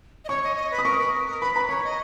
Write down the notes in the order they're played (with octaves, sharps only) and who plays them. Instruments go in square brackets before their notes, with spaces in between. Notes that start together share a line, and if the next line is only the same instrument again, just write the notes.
[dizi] D#5
[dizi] C#5 [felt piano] C#6
[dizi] D#5
D#5
B4
[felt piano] D#6
[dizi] A#4 [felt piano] C#6
[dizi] B4
A#4
A#4
[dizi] B4 [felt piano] B5
[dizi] B4 [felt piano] A#5
[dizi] C#5 [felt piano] C#6
[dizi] D#5